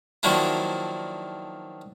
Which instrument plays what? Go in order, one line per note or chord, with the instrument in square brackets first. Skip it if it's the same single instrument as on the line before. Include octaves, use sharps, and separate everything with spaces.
[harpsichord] D#3 F3 F#3 A#3 D4 E4